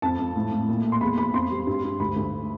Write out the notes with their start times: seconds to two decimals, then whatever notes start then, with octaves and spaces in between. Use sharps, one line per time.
0.02 F2 A5
0.19 F2
0.36 A2
0.52 A2
0.68 A#2
0.85 A#2
0.92 C6
1.01 E2 B5
1.17 E2 B5
1.34 F2 C6
1.51 G3
1.67 G2
1.84 G2
2.00 D2 B5
2.16 D2